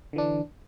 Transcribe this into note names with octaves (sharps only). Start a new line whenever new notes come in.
D3 E3 D4